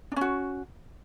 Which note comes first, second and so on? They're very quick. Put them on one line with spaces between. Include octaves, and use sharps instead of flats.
D4 C#4 F#4